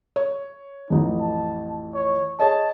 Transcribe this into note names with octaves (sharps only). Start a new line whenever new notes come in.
C#5
A1 F2 D#4
A5
C#5
G#4 C#5 D#5 A5